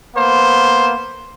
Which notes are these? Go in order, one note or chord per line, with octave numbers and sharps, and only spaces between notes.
A#3 B3 C5